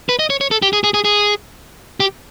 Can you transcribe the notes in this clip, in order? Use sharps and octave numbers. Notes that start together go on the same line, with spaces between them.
B4
D#5
C#5
C#5
A4
G4
G#4
G#4
G#4
G#4
G4